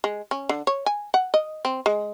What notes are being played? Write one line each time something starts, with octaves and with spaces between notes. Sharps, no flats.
G#3
C#4
D3
C#5
G#5
F#5
D#5
C4
G#3